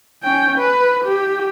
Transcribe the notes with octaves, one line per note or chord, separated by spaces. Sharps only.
C#4 G5
B4
G4